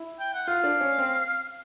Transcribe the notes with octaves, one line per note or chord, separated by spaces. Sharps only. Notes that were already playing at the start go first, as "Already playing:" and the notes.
Already playing: E4
G5
F#5
F4 F5
D4
C#4
C4